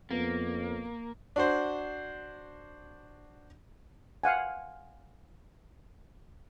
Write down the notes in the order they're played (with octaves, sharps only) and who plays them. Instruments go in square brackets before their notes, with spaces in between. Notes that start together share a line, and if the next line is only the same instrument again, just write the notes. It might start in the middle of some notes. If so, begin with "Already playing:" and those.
[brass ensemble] F2 [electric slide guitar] A#3 [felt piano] B3
[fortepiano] D4 F#4 C5
[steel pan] F5 F#5 G#5